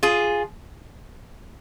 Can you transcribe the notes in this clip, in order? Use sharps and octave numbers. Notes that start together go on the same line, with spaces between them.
F4 G#4